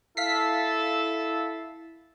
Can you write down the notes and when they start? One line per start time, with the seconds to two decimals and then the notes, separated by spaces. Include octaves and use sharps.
0.17 E4 A4 F5 B6 C7